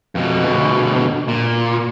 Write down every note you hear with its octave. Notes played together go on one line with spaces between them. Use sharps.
F2 B2
D2 B2
A#2